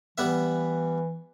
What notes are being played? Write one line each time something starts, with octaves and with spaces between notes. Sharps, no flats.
E3 G3 B3 E5